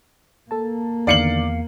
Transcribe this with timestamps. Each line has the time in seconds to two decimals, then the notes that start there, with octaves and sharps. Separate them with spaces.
0.51 A#3 A4 A5
1.07 E2 D3 D#3 D5 F5 C7 C#7 F#7